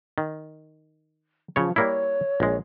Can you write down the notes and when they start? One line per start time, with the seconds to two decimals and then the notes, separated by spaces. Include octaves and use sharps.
0.18 D#3
1.56 C#3 F3 C#5
1.76 G3 A#3 E4 C#5
2.40 A#1 G#3